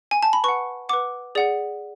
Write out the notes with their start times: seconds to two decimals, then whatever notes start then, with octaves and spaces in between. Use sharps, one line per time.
0.11 G#5
0.23 A5
0.33 B5
0.44 B4 F#5 C#6
0.89 B4 F#5 D6
1.35 G#4 D5 F#5